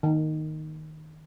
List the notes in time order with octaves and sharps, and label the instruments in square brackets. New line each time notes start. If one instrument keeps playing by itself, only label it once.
[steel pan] D#3